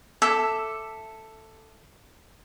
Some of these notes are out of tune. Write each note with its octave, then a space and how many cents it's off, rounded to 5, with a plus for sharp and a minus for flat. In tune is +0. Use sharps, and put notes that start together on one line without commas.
A4 +5 E5 +0 D6 +0